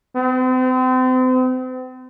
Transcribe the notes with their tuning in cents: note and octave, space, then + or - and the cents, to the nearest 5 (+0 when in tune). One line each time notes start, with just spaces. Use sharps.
C4 -40